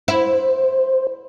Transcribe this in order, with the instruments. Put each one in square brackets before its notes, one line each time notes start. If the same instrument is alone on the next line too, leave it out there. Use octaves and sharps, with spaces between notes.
[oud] E4 [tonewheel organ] C5